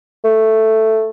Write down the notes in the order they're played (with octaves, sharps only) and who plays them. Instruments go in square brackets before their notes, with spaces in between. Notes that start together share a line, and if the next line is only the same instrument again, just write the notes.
[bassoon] A3